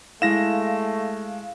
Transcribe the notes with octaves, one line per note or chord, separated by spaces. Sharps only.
G#3 A3 E4 F5 A#6 E7